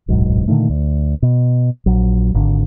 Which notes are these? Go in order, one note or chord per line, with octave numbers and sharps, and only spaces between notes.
D1 B1 G#2 F#3
A#2 D3 D#3 A3
D2
B2
A#1 F#3
G#1 D3